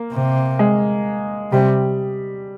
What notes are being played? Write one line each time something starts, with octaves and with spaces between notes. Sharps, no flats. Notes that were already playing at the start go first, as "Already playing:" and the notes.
Already playing: A#3
C3
G#3
C3 G3